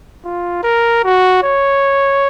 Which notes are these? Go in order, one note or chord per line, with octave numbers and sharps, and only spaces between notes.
F4
A#4
F#4
C#5